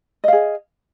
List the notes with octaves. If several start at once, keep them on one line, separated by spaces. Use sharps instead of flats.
G#4 D#5 F5